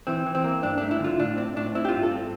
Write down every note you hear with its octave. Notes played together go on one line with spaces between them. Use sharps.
E3 C4
E3
C4
A#3
G2 D4
A3 D4
E4
D3 F4
A2 D4
C4 D4
A2 D4
C4 E4
G4
G2 F4
A4
C4